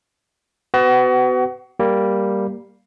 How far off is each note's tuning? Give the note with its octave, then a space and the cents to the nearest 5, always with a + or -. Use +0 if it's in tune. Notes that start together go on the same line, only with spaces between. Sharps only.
B3 +35 F#4 +30
G3 +0 A#3 +0